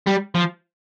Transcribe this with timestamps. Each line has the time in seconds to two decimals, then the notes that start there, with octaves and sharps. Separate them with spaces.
0.07 G3
0.35 F3